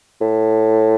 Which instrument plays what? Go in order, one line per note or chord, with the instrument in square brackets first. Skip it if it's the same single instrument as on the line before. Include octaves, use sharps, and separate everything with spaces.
[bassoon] A2